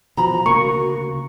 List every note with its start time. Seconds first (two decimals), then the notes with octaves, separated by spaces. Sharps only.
0.17 B2 E3 F3 F#4 A#5 B5
0.46 D2 C#3 A#3 C#6